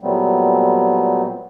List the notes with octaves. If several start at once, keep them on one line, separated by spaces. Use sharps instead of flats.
A#2 F#3 G3 A3 B3 C4